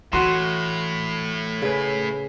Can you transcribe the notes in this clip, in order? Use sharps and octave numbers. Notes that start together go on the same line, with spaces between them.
A2 E3 F#4 C6
C#3 B4